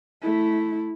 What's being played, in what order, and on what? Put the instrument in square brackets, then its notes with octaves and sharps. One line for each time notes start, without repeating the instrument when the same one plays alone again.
[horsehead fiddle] A3 E4